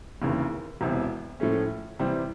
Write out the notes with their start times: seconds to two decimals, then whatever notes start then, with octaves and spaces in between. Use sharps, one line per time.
0.22 F1 D#2 C#3 E3
0.81 E1 E2 C3
1.40 A2 F3 A3 C#4
1.99 C3 E3 G3 C4